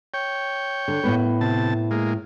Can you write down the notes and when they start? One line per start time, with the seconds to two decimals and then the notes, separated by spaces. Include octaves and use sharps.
0.14 C#5 G5
0.88 D3
1.03 A2 B3 B4
1.41 C3 A5
1.91 G#3 A#3